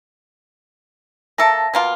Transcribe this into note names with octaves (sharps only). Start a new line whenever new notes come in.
A#3 A4 E5 A5 A#6
B2 A#3 F4